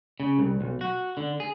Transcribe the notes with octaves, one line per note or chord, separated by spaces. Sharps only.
C#3
C2
B1
F#4
D3
G#4